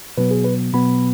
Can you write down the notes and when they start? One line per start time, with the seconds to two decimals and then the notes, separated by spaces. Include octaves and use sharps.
0.17 B2 F#3 B3 B4
0.31 G#4
0.44 B4
0.73 B2 F#3 B3 B5